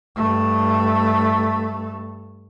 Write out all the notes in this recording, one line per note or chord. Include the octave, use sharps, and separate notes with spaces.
G2 A3